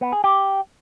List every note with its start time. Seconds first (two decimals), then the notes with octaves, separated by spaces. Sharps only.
0.01 B3
0.12 G#4
0.24 G4